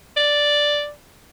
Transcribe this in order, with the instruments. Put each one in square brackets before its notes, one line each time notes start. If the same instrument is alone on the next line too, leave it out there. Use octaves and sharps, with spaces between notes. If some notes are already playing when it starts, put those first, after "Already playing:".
[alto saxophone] D5